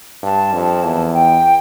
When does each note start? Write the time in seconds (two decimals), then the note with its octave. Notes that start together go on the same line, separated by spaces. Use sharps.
0.23 G2 A5
0.53 F2
0.84 E2
1.13 G5